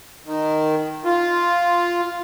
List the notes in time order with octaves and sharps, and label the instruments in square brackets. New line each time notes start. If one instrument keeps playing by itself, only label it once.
[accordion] D#3
F4